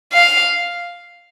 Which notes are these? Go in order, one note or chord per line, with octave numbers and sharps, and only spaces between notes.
F5